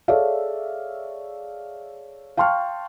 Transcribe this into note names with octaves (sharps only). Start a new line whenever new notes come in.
G#4 A4 C#5 D5 E5 F5
F5 G5 A5 C6 C#6 F6